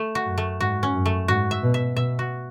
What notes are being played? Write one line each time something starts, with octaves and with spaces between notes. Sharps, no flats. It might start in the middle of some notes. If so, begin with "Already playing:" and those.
Already playing: A3
F#4
F#2
A3
G#2 F#4
C#4
F#2
A3
G#2 F#4
E5
B2
E5
B2 E5
F#4